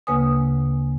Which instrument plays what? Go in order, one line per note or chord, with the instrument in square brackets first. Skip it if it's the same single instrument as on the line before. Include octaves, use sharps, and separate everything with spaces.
[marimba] D2 C#3 A#3 B4 G#5 D#6